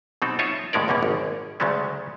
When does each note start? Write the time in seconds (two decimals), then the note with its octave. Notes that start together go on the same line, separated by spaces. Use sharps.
0.22 B2 F#3 C4 D#4 A4
0.39 D#4 F4 C#5 E5
0.73 D#2 A2 G#3 C#4 A#4 D5
0.88 C#2 F#2 B2 G3 A#3 C#4
1.03 G#1
1.60 D2 C#3 F#3 G#3 A3 C#4